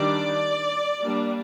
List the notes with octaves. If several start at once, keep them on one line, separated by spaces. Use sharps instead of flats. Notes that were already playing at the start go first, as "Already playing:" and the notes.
Already playing: D#3 G3 D4 D5
G3 A#3 D4